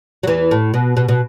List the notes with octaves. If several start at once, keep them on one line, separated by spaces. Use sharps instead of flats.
F#3
E2 E3
A2
B2
B2
B2